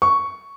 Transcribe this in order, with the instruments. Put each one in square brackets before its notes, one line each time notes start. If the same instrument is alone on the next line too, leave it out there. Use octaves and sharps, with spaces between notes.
[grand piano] C#6